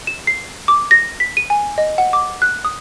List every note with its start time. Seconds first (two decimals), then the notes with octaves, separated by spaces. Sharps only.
0.07 E7
0.27 C7
0.68 D6
0.91 A#6
1.20 B6
1.37 D#7
1.50 G#5
1.78 D#5
1.98 F#5
2.13 D6
2.42 F#6
2.65 D#6